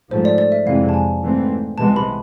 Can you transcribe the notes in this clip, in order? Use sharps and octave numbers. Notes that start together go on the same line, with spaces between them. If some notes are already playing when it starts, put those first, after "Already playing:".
G#2 F3 A3 C5
D5
D5
E5
F2 C3 E3 G#3 F5
A5
G#5
G#2 E3 A3 C4
C2 C3 E3 G#3 B3 A5
B5